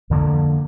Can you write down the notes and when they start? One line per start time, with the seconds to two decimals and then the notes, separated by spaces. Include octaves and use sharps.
0.10 F2 D3 F3 A#3